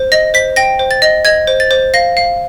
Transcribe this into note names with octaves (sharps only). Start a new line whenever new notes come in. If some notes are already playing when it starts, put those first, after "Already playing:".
Already playing: C5
D#5 A#6
C5 B6
G5 A#6
C5
A6
D#5
D#5 G#6
C5
A6
C5
F5 A#6
F5